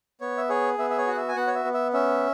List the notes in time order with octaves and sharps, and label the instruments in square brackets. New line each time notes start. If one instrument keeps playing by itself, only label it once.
[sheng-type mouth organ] B3 C#5
E5
G#4 C#5
B3 E5
E5
C#5
F#4 F#5
E5
G#5
B3 F#5
C#5
E5
B3
E5
C#4 E5